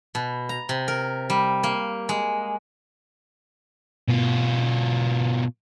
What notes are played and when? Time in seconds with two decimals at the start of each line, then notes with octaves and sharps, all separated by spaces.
0.15 B2
0.49 A#5
0.69 C3
0.88 A#4
1.30 G3
1.63 A#3
2.09 G#3
4.09 B2 F4